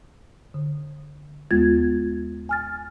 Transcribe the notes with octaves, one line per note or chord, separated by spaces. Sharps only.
D3
D#2 G#3 B3 F4 G#6 A6
G#5 F6 A6